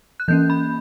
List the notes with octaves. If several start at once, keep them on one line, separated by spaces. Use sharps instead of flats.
F#6
E3 A#3 C#4 G6
B5